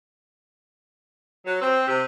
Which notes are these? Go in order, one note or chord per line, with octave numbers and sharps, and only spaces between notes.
F#3
C4
C3